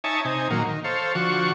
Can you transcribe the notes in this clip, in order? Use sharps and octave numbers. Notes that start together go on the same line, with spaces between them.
D#4 C#5 E5 G#5 A5
C3 D#4 G#5
A#2 D#3 F#3 A#3
D#3
A4 C5 C#5 F5
D3 F3 F#4 C#6